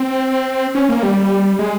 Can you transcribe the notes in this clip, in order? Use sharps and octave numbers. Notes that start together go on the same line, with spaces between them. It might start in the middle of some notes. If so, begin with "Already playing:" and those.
Already playing: C4
C#4
A#3
G3
G#3